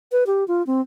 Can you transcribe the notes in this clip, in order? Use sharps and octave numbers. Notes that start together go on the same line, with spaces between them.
B4
G4
F4
C4